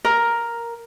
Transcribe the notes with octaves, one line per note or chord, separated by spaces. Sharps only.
A#4